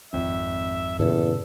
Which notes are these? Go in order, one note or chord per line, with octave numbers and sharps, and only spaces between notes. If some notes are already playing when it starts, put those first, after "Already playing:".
G#1 F2 E5
E2 G2 A#2 C#3 A4